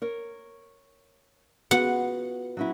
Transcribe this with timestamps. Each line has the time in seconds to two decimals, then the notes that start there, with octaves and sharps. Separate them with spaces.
0.02 A#4 C#5
1.71 B3 F4 F#4 F#5
2.57 F#3 C#4 E4